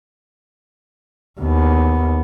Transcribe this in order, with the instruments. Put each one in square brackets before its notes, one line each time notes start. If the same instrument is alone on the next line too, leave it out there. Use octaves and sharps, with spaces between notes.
[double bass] D#2 B3